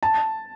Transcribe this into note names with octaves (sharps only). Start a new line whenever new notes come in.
A5